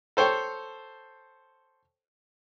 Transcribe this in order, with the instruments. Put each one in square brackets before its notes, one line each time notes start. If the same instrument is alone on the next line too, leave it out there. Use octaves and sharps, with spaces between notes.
[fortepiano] A4 C5 C#5 G5